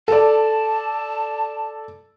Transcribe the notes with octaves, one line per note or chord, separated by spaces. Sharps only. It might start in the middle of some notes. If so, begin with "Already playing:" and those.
A4 D5 A5